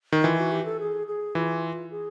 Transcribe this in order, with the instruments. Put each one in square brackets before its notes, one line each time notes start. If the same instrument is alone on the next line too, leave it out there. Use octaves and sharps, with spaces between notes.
[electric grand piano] D#3
[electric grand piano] E3 [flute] F4
[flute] F#4
G4
A4
G#4
G#4
[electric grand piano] E3 [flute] F4
[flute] G#4